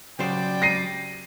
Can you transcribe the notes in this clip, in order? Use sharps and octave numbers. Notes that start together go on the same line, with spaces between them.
C#3 F#3 G3 C5 D5 G5
A#6 C7 D#7